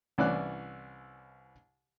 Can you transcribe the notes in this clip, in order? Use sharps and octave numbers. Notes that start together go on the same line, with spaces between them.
C2 E3 C#4 D4 D5 F#6